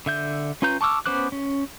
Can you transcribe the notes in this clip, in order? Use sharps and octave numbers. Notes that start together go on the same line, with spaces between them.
D3 E5 G6
C#4 F4 B4 A#5 G6
A5 C#6 D6 E6 F6
B3 C#4 C5 D6 F#6
C#4